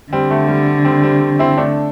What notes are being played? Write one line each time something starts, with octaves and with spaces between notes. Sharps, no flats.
D3 G3 C4
A3
G3
G3 C4
G3 C4
C4 E4
A3 D4